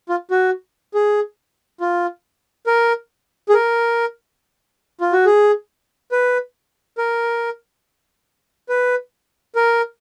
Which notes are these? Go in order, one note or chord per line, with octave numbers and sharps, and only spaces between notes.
F4
F#4
G#4
F4
A#4
G#4
A#4
F4
F#4
G#4
B4
A#4
B4
A#4